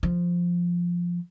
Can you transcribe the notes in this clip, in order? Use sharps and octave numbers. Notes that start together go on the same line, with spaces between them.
F3